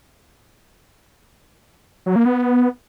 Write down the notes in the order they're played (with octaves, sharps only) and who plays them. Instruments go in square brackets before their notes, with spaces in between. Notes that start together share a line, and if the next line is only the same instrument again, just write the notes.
[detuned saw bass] F#3
A#3
B3